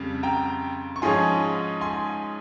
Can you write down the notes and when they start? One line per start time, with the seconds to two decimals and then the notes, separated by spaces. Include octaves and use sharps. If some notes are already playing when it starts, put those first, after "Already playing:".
Already playing: F2 C#3 G3
0.23 G5 A#5
0.96 C#6
1.02 G#2 F3 G#3 C#4 G#5 C6
1.81 G#5 C6